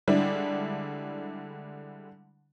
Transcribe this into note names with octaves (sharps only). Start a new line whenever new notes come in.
D3 G3 G#3 D4 E4